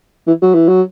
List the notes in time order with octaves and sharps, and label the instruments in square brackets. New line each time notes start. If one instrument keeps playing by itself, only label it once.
[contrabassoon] E3
F#3
E3
F#3